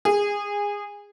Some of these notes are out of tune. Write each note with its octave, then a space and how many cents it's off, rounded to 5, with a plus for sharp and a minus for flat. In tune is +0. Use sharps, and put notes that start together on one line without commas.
G#4 -20